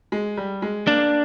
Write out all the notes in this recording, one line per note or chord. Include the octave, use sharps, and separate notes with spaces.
G#3
G3
G#3
A#3 D4